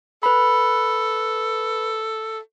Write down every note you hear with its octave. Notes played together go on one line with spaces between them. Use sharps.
A4 B4 B5